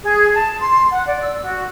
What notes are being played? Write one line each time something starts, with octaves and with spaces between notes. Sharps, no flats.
G#4
A5
C6
F#5
D5
E6
F#4